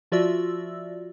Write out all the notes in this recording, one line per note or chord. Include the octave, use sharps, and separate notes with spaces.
F3 F4 F#4 D5 E5 E6